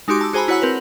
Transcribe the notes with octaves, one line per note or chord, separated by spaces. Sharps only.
G#3 D#4 F#4 G4 C6 D6
A5 E6
F#4 G#4 C5 G#5 A#5 B5
E4 F#4 C#5 F#5 B5 E6
C4 A#4 B4 F#7